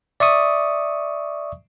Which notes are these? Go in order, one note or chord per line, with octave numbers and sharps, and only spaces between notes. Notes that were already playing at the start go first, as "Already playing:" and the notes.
D5 E5 C#6 D#6